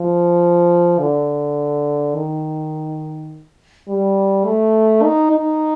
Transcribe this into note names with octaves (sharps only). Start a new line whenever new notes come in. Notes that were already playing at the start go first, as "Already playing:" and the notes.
Already playing: F3
D3
D#3
G3
A3
D#4
D#4